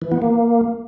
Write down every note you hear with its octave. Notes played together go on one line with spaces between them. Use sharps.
E3
B3
A#3